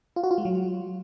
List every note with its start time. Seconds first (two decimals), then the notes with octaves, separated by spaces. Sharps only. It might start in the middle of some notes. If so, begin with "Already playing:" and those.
0.16 F4
0.24 F#4
0.31 F4
0.38 G#3
0.45 F#3